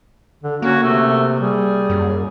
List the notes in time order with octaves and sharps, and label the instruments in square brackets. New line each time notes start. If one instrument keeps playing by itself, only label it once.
[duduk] D3
[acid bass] A#3 [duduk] C#4 [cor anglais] F#4
[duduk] C3 [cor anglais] A3
[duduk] G3 [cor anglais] G#4
[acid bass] F#2